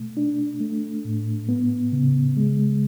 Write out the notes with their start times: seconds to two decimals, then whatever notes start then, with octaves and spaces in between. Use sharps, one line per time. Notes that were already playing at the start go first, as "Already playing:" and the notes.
Already playing: B2 A3
0.17 D4
0.60 A3
1.05 A2
1.49 B3
1.92 C#3
2.37 G#3